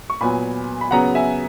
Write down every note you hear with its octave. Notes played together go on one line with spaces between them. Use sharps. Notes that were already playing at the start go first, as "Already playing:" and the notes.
C#6
A#2 F#3 B3 G#5 B5
B5
C#3 F#3 B3 F#5 A#5
E5 G#5